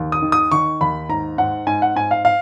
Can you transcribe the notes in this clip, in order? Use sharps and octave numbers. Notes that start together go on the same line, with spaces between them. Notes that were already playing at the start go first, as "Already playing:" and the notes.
Already playing: D#2
D#6
D#3
D#6
D#3 C#6
D#2 B5
G#2 A#5
G#2 F#5
G#2 G#5
F#5
G#2 G#5
F5
F5